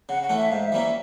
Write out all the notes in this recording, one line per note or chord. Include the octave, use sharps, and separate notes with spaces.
C#3 F#5
F#5
E3 A3 C#4
E5
G#2 F5
E5
E3 G3 A#3 C#4